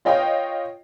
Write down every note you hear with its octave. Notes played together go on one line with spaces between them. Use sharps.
F4 C#5 D#5 F5 G5